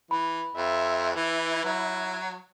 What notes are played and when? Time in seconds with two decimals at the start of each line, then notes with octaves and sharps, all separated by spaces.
0.11 E3 B5
0.56 F2 E5
1.16 E3 E4
1.64 F#3